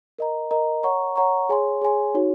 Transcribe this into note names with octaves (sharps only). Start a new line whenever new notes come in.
A#4 D#5 A#5
A#4 D#5 A#5
C#5 F#5 A#5 C#6
C#5 F#5 A#5 C#6
G#4 C#5 G#5 C6
G#4 C#5 G#5 C6
D#4 F#4 C#5